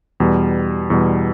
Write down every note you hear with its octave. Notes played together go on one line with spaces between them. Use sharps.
E2 B2 G3
E2 B2 G3